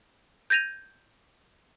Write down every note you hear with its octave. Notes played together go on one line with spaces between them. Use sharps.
G6 G#6 A#6 D#7 F7